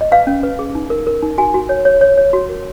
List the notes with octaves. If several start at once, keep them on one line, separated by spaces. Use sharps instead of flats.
D#5
B4 F5
C#4
B4
G#4
D#4
A#4
A#4
D#4
F#4 G#5
F#4
C#5
C#5
C#5
C#5
F#4
A#4